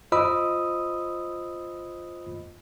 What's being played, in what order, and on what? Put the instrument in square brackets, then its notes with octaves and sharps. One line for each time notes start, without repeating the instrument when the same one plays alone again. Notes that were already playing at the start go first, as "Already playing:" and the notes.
[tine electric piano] F4 C5 D#5 B5 D#6 E6